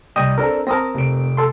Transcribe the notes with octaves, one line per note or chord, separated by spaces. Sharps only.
C2 D#5 G5 D#6 D#7
C4 D4 A4 A#4
C4 A#4 A5 D#6 A#6
F1 D7
A4 C6